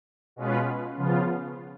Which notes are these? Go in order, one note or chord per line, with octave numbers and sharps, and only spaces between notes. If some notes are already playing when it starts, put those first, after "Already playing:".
B2 G#3 C#4 F4 B4
C#3 F3 B3 F4